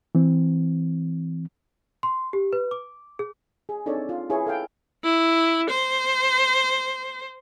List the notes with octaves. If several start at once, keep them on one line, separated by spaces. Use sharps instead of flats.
E3 C4
C6
G4
B4
D6
G#4
G#4
C4 D4 D#4 A4 C#5 D5
F4
E4 G#4 B4 C#5
A4 F5 G5
E4
C5